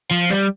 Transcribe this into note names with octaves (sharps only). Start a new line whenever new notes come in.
F3
G3